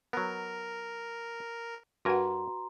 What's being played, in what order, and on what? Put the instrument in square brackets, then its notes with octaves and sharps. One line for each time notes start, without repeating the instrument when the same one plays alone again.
[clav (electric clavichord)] F#3 B3 [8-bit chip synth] A#4
[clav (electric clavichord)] G2 A#4 G#5 [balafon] F#4 B4 F#5 [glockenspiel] A#5 C6